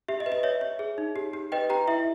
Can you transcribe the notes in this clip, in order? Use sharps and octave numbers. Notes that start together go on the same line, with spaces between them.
G4 E5
D#5
B4
D#5
C#5 E5
C#5
G#4
D#4
G4
G4
B4 D#5 G5
G4 G5 A#5
E4 E5